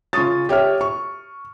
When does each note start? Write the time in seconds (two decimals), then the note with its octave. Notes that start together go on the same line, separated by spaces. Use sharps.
0.13 C#3 F4 C#6 D#6 A6
0.49 G4 C#5 E5 F6
0.81 C#6